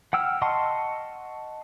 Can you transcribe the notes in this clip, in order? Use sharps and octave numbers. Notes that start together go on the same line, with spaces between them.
F#5 G5 E6 F6
D#5 F#5 A5 C6 C#6